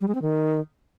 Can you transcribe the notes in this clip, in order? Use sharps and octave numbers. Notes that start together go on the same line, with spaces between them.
G3
G#3
C4
D#3